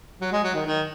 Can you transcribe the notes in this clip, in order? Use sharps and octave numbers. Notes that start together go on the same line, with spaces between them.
F#3
G#3
F#3
D#3
D#3